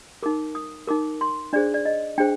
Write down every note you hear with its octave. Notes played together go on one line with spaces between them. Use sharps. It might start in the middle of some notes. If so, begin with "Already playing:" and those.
D#4 A#4 D6
D#6
D#4 A#4 D6
C6
D4 G#4 C5 D5
D5
D#5
D4 G#4 C5 G5